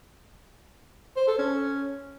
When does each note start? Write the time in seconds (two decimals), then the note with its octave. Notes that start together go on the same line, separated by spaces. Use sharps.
1.17 C5
1.27 A4
1.38 C#4